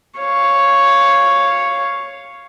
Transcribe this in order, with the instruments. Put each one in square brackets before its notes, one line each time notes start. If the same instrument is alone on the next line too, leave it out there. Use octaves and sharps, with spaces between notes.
[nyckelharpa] C#5 F5